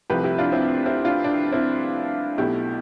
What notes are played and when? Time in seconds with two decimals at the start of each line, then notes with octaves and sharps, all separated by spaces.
0.10 C2 C3 F3 A3 G4 B4
0.24 E4 G4
0.38 D4 F4
0.52 C4 E4
0.86 C4 E4
1.05 D4 F4
1.24 D4
1.52 C4 E4
2.38 B1 B2 A3 E4 G4